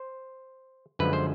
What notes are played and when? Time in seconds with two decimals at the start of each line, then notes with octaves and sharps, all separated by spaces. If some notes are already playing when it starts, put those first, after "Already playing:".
Already playing: C5
0.99 F#2 D3 F3 G#3 B4
1.13 C5